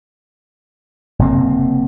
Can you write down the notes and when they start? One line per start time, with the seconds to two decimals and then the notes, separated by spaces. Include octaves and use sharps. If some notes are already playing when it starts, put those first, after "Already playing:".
1.19 F#1 C3 A#3 C4